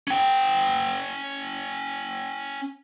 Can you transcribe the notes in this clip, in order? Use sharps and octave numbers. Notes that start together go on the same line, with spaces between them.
C#4 G5